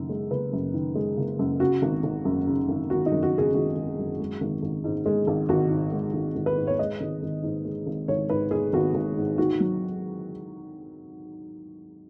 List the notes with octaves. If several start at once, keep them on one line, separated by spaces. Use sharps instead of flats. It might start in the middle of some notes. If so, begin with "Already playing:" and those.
Already playing: F#1 F#2 D#3
G#3
F#1 B4
F#2
D#3
G#3
F#1
F#2
C#3 F#4
G#1
G#1
F#2
C#3
G#1
G#1 F#4
D#4
F#2
F#4
C#3
G#4
G#1 F#4
G#1
F#2
G#3
G#1
G#1
G#2
G#3
G#1
G#1 F#4
G#2
G#3
G#1
G#1
B4
G#2
C#5
G#3 D#5
G#1
G#1
G#2
G#3
G#1
G#1 C#5
G#2 B4
G#3 G#4
G#1 F#4
G#1
G#2
D#3 F#4
F#3